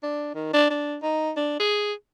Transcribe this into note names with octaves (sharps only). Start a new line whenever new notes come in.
D4
D#3
D4
D4
D#4
D4
G#4